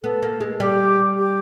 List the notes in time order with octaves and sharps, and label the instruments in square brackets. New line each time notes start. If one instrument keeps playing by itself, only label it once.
[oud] B3 [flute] A4
[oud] A#3
G#3
[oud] G3 [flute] G4
[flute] G4